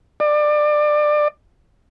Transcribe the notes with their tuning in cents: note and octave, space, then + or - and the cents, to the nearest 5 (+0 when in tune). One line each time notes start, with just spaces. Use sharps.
D5 +25